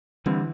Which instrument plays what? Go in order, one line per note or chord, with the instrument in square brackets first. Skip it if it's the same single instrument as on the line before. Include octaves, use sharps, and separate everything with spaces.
[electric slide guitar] D3 G3 C4 [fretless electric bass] E3